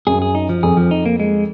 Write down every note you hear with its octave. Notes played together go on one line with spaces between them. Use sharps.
F#2 G#4
G#4
D#4
F3
F2 G#4
F3
D#4
A#3
G#3